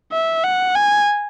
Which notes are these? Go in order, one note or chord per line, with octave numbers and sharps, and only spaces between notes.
E5
F#5
G#5